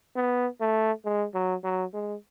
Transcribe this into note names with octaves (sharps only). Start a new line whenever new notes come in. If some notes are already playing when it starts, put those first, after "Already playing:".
B3
A3
G#3
F#3
F#3
G#3